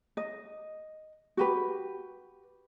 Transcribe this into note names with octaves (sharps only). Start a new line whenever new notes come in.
D#5
F#4 G4 B4